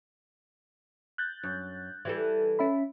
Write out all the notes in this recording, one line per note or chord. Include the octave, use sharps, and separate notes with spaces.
F#6 G6 A6
F#2
E3 G3 A4
C#4 E5 B5